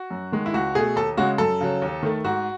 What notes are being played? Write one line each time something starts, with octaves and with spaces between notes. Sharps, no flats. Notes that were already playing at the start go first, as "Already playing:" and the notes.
Already playing: F#4
F#2
D#3 G#3
E4
C#2 F#4
B2 A3 G#4
D#2 A4
C#3 G#3 F#4
F#2 A4
C#3 F#3
D#2
D#3 A3
G#2 F#4